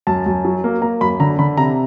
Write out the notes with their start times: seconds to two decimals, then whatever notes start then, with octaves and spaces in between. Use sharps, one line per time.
0.07 F#2 A5
0.26 F#2
0.45 F#3
0.64 A#3
0.82 A#3 A#5
1.01 F#2 B5
1.20 D3 A#5
1.39 D3 B5
1.57 C3 A#5